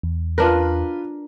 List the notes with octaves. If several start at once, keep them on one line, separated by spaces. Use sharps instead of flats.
E2
D4 F4 A#4 B4